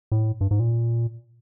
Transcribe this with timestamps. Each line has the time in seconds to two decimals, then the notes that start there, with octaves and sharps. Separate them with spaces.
0.12 A2
0.41 G2
0.51 G#2
0.60 A#2